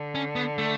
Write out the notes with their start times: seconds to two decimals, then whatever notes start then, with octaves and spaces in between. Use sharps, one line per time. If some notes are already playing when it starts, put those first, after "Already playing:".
Already playing: D3
0.15 C#4
0.36 B3
0.58 A3